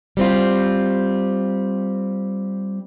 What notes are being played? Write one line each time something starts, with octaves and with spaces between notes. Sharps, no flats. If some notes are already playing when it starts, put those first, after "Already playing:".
G3 C4 F4